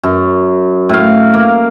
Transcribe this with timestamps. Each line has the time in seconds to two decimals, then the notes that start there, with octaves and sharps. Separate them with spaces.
0.03 F#2
0.89 A2 F5
1.34 A#3